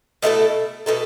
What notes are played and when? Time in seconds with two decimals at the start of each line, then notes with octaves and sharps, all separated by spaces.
0.22 B2 A3 E4 A4
0.86 B2 A3 E4 A4